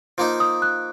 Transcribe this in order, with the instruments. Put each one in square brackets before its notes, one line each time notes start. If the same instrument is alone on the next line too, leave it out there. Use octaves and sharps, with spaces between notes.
[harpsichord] F3 A#3 D#4
[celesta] D#6
F#6